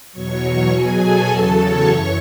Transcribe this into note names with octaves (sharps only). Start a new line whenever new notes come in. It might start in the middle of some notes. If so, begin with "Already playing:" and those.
E2 B2 F#3 C#5 C#6
B2 F#3 G#4 G#5
A4 A5
E2 C#3 F#3
C#5 C#6
F#2 E3 C#5 C#6